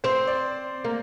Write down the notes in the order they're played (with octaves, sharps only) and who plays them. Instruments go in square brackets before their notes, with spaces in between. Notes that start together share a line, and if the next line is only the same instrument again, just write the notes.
[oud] C4 [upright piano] C5
[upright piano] D5
[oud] A#3